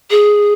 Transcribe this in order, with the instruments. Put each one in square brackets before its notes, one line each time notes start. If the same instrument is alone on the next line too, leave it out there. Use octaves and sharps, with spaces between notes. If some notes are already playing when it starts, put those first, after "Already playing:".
[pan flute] G#4